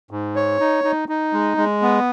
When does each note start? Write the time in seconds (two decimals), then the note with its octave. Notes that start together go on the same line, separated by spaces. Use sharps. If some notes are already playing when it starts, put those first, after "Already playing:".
0.11 G#2
0.36 C#5
0.60 D#4
0.84 D#4
1.09 D#4
1.33 G#3
1.57 G#3
1.82 B3